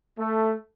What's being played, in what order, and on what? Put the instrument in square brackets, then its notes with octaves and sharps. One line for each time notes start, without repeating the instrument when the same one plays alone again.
[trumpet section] A3